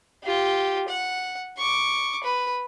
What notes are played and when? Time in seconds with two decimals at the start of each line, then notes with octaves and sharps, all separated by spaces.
0.23 F4 G4
0.88 F#5
1.57 C#6 D6
2.23 B4